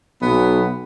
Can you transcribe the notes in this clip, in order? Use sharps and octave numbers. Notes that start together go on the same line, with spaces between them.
B1 B3